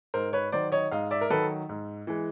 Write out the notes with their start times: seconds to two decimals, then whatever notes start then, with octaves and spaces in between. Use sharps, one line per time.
0.14 G#2 A#4 C5
0.33 B4 C#5
0.52 D#3 F#3 C5 D5
0.72 C#5 D#5
0.91 G#2 D#5 F5
1.11 D5 E5
1.21 A#4
1.30 D#3 F#3 A4 B4
1.69 G#2
2.07 E3 G#3